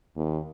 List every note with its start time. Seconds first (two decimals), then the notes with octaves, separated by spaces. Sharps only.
0.17 D#2